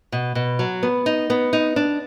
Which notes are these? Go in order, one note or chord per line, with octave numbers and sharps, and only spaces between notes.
B2
B2
F#3
B3
D#4
B3
D#4
D4